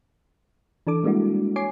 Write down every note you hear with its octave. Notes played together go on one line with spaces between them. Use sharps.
E3 D4 A4 D6
G3 G#3 A#3 D4 E4 F#4
C#5 G#5 D6 C7